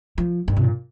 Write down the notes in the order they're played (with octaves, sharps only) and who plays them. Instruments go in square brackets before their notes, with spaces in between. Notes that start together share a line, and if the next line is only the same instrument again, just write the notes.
[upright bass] F3
G2
C3
A#2